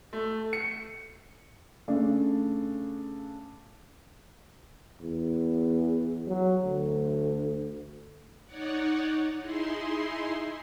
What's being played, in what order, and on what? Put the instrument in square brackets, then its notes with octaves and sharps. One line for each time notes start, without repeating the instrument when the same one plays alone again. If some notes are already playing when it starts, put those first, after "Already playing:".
[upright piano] A3
C#7
C#3 A3 D4
[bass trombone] E2
F#3
D2
[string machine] D#4 C#5 D5 F#5
D#4 E4 G#4 C6